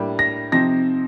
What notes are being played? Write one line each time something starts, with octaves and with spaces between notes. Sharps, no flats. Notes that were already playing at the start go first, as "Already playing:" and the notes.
Already playing: A2 G3 A#3 D4
A#6
C3 F3 C4 D#4 A#6